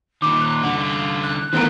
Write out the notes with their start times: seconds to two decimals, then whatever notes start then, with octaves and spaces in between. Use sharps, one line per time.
0.22 A#2 D#3 D6
0.41 F#6
0.62 C2 D3 F#5
0.78 F5
1.23 F#6
1.53 D#3 E3 A3 B3 A#4